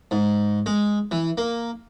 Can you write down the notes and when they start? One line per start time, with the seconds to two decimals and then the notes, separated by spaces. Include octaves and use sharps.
0.11 G#2
0.66 G#3
1.11 E3
1.38 A#3